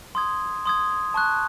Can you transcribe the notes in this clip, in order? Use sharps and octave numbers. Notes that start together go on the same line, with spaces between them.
C6 D#6 G#6
C6 D#6 G#6
A5 C#6 F#6